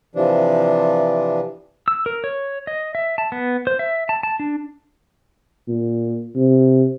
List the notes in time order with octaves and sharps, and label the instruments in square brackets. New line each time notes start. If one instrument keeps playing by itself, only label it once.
[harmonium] C3 E3 F3 D4
[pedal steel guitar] E6
A#4
C#5
D#5
E5
A5
B3
C5
E5
A5
A5
D4
[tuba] A#2
C3